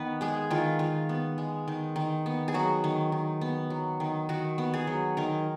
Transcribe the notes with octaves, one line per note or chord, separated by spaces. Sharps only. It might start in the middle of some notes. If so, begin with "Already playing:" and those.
Already playing: D#3 B3 B4
G#3 G#4
D#3 F4
D#3 F4
B3
G#3
D#3
D#3
B3
G#4
F#3 F#4
D#3
D#3
B3
F#3
D#3
D#3 F#4
B3
G#4
F#3
D#3 A#4